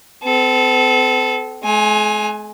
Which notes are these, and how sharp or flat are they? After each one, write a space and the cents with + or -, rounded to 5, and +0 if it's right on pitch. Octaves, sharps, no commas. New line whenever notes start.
C4 -45 A4 -20
G#3 +45 G#5 +0